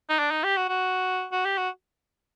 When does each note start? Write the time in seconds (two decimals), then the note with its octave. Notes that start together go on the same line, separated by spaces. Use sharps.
0.09 D#4
0.19 D4
0.31 D#4
0.44 G4
0.57 F#4
0.69 F#4
1.32 F#4
1.45 G4
1.57 F#4